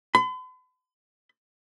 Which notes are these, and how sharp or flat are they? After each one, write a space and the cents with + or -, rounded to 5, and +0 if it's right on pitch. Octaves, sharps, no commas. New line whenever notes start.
B5 +45